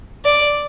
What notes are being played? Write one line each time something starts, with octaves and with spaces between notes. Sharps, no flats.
D5